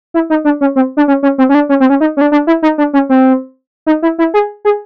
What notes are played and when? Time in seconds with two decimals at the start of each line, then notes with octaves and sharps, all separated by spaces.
0.14 E4
0.30 D#4
0.45 D4
0.61 C#4
0.76 C4
0.97 D4
1.08 C#4
1.23 C#4
1.38 C4
1.49 C#4
1.55 D4
1.69 C#4
1.80 C4
1.90 C#4
2.01 D#4
2.17 C#4
2.21 D4
2.32 D4
2.47 E4
2.62 D#4
2.78 D4
2.93 C#4
3.09 C4
3.86 D#4
4.02 E4
4.18 E4
4.34 G#4
4.65 G#4